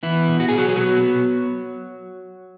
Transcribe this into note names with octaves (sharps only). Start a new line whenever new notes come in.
E3 B3 E4
B2
F#4
B2 G#4
F#3 F#4
G#4
F#3 B3 F#4
B3